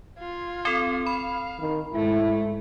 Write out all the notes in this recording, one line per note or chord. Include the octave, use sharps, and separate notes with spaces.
F4 G#6
C4 A4
F5 B5
D#3
G#2 A3 E4